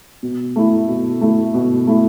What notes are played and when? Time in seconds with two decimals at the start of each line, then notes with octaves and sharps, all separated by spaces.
0.23 B2
0.56 A3 E4
0.88 B2
1.21 A3 E4
1.54 B2
1.87 A3 E4